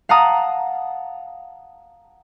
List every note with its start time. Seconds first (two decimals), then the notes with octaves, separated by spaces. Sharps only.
0.09 F5 F#5 A5 A#5 D#6